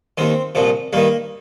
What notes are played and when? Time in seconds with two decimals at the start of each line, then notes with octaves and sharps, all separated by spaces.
0.18 D#2 D#3 C4
0.55 C2 A#2 F3
0.93 G2 D#3 A#3